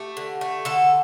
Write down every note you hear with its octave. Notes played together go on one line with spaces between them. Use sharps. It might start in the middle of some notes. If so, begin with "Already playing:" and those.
Already playing: A3 G4
D3
A3
D3 A4